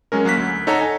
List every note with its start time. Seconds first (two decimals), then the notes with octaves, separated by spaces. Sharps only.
0.12 F#3 G#3 C#4 A#4
0.25 F#3 A#3 F#6 B6
0.37 D2
0.67 D#4 A4 C#5 F#5 A#5
0.81 G#5